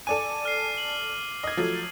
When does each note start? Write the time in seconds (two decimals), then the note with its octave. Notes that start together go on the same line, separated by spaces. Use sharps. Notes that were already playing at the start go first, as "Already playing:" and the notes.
0.07 A4 D5 G#5 D6 D#7
0.45 F6 C7
0.77 F#7
1.43 D#5 G#6
1.57 F3 F#3 A3